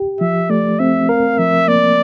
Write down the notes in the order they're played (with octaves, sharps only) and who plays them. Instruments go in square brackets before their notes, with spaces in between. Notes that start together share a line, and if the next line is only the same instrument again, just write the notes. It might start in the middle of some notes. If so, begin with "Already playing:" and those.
Already playing: [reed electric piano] G4
[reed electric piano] F3 [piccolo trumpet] E5
[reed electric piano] A3 [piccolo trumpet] D5
[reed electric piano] C4 [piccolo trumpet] E5
[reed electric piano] A#4 [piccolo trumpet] F5
[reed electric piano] F3 [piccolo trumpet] E5
[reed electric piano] A#3 [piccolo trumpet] D5